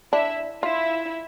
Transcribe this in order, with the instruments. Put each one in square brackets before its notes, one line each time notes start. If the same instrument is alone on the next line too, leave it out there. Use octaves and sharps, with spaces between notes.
[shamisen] D4 [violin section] E4 E5
[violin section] E4 E5 [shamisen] F4